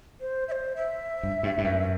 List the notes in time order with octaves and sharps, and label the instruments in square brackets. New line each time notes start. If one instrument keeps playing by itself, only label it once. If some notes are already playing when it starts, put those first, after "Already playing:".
[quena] C5
E5
C5
E5
[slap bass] G2
G2
G2
F#2